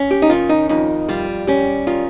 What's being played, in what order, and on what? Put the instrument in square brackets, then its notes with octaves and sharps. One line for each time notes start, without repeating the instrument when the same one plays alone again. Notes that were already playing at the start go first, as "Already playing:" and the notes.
Already playing: [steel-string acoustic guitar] C#4
[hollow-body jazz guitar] G4
D#4
[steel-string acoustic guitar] D#3 [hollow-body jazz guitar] F4
[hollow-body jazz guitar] D#4
[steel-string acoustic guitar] F2 [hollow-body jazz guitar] D#4
[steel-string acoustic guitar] G3 [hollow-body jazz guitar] F4
[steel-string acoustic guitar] C#4 [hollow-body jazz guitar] G4
[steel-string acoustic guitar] D#3 [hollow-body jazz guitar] F4